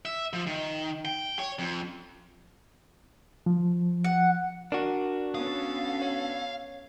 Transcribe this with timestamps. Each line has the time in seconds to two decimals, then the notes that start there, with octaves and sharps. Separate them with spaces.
0.05 E5
0.33 F3
0.47 D#3
1.05 G5
1.39 C#5
1.59 F2
3.46 F3
4.04 F#5
4.72 D4 F#4 A#4
5.35 B3 C#4 A4 F5 D#6
6.02 C#5